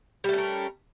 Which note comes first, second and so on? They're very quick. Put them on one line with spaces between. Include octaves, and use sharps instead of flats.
G3 A3 C#4 A#4